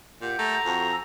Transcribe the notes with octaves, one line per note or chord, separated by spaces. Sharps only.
A#2 G4 F#5 G6
A3 A#5
F2 F#4 F#5 A5
G#5 E6